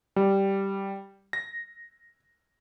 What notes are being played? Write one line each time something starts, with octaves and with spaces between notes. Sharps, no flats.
G3
A#6